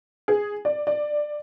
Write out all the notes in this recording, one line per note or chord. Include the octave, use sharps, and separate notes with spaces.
G#4
D5
D5